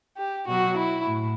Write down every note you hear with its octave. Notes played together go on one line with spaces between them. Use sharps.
G4
B2 F#3 F#4
E4
A2